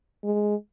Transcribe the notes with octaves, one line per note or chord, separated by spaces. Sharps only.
G#3